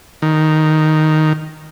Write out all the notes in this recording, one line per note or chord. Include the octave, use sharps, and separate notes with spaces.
D#3